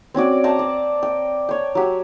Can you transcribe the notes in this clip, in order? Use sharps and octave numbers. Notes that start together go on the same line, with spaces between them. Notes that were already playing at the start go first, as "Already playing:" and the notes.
C4 C#4 F#4 D5
C5 G5 A5 A#5
D5
G5
C#5 G5
F#3 G4